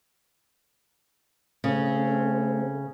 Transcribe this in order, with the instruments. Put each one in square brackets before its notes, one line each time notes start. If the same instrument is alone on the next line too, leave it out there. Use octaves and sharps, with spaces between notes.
[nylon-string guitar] C#3 [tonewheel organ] A3 C4